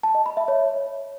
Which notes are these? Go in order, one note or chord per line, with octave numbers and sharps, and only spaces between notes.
A5
D#5
B5
E5
C#5